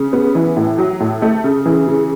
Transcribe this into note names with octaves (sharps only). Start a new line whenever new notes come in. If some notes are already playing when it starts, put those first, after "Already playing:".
Already playing: C#3
B3
E3
A2
F#3
A2
A3
C#3
E3
C#3